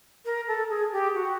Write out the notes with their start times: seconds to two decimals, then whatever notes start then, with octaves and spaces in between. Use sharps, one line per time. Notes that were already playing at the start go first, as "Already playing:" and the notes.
0.25 A#4
0.47 A4
0.69 G#4
0.92 G4
1.14 F#4